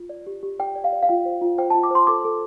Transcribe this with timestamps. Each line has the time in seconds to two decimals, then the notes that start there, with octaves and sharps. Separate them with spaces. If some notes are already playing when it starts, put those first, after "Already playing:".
Already playing: F4
0.09 D5
0.27 G4
0.43 G4
0.59 D5 G5
0.76 D5
0.84 F5
0.93 D5
1.03 F5
1.09 F4 G5
1.25 C5
1.42 F4
1.58 C5 G5
1.70 A5
1.75 F4
1.83 D6
1.91 C5 C6
2.07 A4 D6
2.25 A4